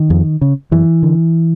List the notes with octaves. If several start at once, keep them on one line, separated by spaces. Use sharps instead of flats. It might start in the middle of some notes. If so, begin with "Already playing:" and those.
Already playing: D#3
F2
C#3
F#2 E3
D3